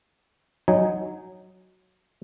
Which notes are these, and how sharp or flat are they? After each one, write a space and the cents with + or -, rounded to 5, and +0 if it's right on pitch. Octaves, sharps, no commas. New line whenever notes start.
F#3 +0 D#4 +0 G#5 +0